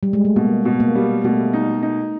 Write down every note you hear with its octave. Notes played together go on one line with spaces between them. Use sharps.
G3
G#3
A3
B2 A#3
B2
A#3
G3
B2 A3
D#4
D#4